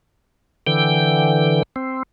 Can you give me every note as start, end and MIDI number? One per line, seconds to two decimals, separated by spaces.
0.67 1.63 50
0.67 1.63 52
0.67 1.63 79
1.76 2.03 60